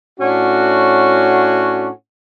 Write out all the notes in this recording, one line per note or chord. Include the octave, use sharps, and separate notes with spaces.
A2 C#4 D4 F#4